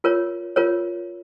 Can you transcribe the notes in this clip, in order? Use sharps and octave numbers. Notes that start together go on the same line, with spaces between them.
F4 A#4 C#5
F4 A#4 C#5